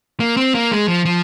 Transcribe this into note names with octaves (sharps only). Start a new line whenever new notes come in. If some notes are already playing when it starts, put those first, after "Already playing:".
A#3
C4
A#3
G#3
F3
F3